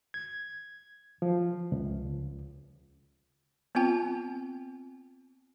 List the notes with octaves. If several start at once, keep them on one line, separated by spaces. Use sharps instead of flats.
G#6
F3
C#2
B3 C4 F4 G5 A5